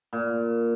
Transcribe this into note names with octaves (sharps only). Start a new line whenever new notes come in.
A#2